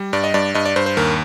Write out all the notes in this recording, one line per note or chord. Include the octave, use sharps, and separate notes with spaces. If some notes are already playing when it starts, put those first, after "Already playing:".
Already playing: G3
G2 D5
D#5
G2 D5
G2 D#5
D5
G2 C5
C5
D#2 A#4